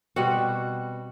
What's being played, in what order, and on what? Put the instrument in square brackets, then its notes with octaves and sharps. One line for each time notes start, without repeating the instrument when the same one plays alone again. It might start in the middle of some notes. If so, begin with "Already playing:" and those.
[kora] B2 G3 C4 F#4 F#5